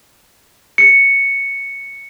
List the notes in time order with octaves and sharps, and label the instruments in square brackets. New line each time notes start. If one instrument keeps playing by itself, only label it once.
[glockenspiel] C#7